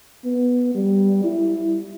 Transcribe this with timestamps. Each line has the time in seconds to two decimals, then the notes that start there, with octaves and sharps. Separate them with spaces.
0.25 B3
0.75 G3
1.24 E4